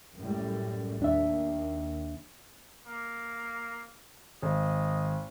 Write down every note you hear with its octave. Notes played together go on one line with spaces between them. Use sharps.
F#2 A2 G3
D#2 D4 E5
A#3
G#1 D#5